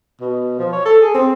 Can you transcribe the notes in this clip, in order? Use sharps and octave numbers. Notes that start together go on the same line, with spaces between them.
B2
F3
C#5
A4
G#4
C4